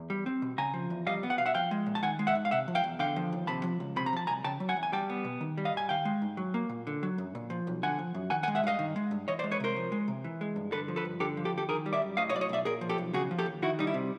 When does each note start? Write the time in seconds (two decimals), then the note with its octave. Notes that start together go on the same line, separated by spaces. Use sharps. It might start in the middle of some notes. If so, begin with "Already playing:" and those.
Already playing: E2
0.10 G3
0.26 C4
0.42 B2
0.58 C#3 G#5 A#5
0.74 F3
0.90 E2
1.07 G3 D#5 F5
1.23 B3
1.30 F#5
1.38 B2 F5
1.46 E5 F#5
1.54 F3 F5 G5
1.71 G#3
1.86 A#2
1.95 A5
2.03 D#3 F#5 G#5
2.19 G#3
2.27 E5 F#5
2.35 G#2
2.45 F5
2.51 C3 E5 F#5
2.68 F3
2.75 F5 G5
2.84 E2
2.99 D3 F5 G5
3.16 F3
3.33 D#2
3.47 C3 A5 B5
3.64 F3
3.80 C#2
3.96 C3 B5
4.06 A#5
4.13 F3 A5
4.27 C2 G#5 A#5
4.44 C#3 G5 A5
4.60 F#3
4.69 F#5 G#5
4.76 E2
4.83 G#5
4.92 G3 G5 A5
5.10 B3
5.25 B2
5.41 D#3
5.58 G3
5.65 D#5 F5
5.74 G2 G#5
5.89 D#3 F5 G5
6.05 G#3
6.22 G#2
6.37 F#3
6.54 A#3
6.69 A#2
6.87 D3
7.03 F#3
7.18 F#2
7.35 A#2
7.50 F3
7.67 B1
7.83 D3 F#5 G#5
7.99 F3
8.14 F#2
8.30 D#3 F#5 G#5
8.43 F#5 G#5
8.48 G#3
8.55 E5 F#5
8.64 G2 D#5 F5
8.79 D#3
8.96 G#3
9.11 G2
9.28 E3 C#5 D#5
9.39 C5 D5
9.44 G#3
9.51 B4 C#5
9.60 C3 A#4 C5
9.76 F3
9.92 G#3
10.08 C3
10.24 E3
10.41 G#3
10.56 G2
10.72 D3 A4 B4
10.88 F3
10.96 A4 B4
11.05 G2
11.20 D3 G4 A4
11.37 F3
11.45 G4 A4
11.52 D2
11.58 G4 A4
11.69 D#3 G#4 A#4
11.86 G3
11.93 D5 E5
12.02 F#2
12.17 A2 D#5 F5
12.29 C#5 D#5
12.34 F#3 D5
12.41 C#5 D#5
12.49 B1 D5 E5
12.65 A#2 G#4 A#4
12.81 F3
12.89 G4 A4
12.98 B1
13.14 C#3 F#4 G#4
13.31 F3
13.39 G4 A4
13.46 D#2
13.62 D#3 E4 F#4
13.79 G3 D#4
13.87 E4
13.94 C3